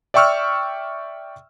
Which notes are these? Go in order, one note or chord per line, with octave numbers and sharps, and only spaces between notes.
D5 E5 G5 C#6 E6 F6